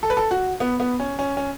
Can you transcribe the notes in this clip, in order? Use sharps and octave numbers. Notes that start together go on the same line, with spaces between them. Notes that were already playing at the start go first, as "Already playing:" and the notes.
A4
B4
A4
F#4
B3
B3
C#4
C#4
C#4